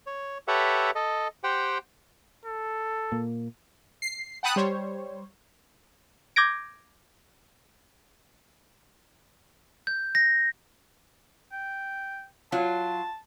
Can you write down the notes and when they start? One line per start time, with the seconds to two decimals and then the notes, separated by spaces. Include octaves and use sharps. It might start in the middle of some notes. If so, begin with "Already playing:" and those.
0.07 C#5
0.48 G4 A4 B4 C#5 E5 F#5
0.95 A4 D#5
1.44 G4 C5 F#5 G5
2.45 A4
3.12 A#2 A#3
4.02 C7
4.43 F#5 G5 A5 B5 D#6 F#6
4.56 G3 C5 C#5
6.36 D6 G6 G#6 A#6 D7
9.87 G6
10.15 A#6
11.52 G5
12.52 F#3 F4 A5